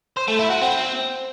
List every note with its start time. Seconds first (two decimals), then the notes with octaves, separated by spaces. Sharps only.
0.17 C5
0.28 A3
0.39 E4
0.50 F#4
0.61 C4